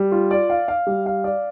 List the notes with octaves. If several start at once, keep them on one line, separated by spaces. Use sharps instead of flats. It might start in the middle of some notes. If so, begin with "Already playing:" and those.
Already playing: G3
F4
D5
F5
F5
G3
F5
D5